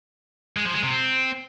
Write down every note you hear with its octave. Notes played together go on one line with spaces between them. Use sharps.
G#3
F3
G#3
C3
C4